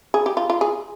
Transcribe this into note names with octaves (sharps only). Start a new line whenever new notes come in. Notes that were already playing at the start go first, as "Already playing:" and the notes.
G#4
G4
F4
F4
G#4